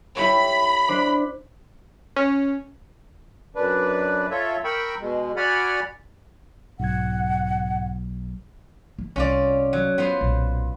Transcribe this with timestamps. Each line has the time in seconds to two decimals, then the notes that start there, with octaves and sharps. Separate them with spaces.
0.17 E4 G4 C#5 B5
0.88 D4 C5 D6
2.16 C#4
3.55 F#2 D4 B4
4.31 F4 A4 C#5 E5
4.64 A#4 G5 B5 C#6 E6
5.01 B2 G#3
5.37 F#4 D5 F#5 G#5 B5 F6
6.80 B1 G#2 F#5 G#6
8.99 E4
9.16 C2 C#4 F4 D5
9.73 F#3
9.98 B3 F4 C5
10.21 B1 A#2